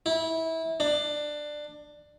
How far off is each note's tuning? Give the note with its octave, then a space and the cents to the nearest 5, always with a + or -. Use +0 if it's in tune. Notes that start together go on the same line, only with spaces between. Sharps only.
E4 -25
D4 +15